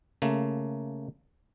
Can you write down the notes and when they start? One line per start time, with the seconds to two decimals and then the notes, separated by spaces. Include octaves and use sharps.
0.22 C#3 A3 A#3